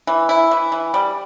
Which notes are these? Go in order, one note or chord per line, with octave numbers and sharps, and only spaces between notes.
E3
E4
E3
E3
G3